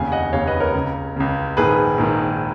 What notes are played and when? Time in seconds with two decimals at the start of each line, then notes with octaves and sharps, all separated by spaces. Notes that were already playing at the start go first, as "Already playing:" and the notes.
Already playing: F1 D#2 C#3 F5 G#5
0.12 D#5 F#5
0.33 F1 D#2 C#3 C#5 F5
0.47 B4 D#5
0.60 A#4 C#5
0.74 C#2 C#3
1.16 C#2 C#3
1.57 A#1 G#2 D#3 G#4 B4
1.98 A#1 G#2 D#3